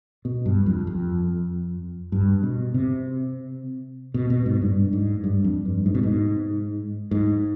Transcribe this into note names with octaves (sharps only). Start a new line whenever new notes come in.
B2
G2
F2
F2
G2
B2
C3
B2
B2
G#2
G2
G#2
G2
F2
G2
G#2
B2
G#2
G#2